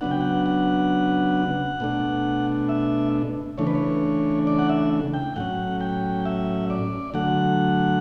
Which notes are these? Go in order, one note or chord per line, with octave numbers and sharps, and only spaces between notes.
C#3 F#3 B3 D4 F#5
G5
F#5
F#5
B2 A3 D4
E5
C#3 E3 A3 D4 C#5
B4
C#5
D5
F#5
E5
G5
A2 F#3 C#4 F#5
G5
E5
D5
D3 F#3 A3 F#5